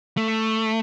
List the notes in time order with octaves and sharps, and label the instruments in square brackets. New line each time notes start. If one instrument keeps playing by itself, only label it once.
[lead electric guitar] A3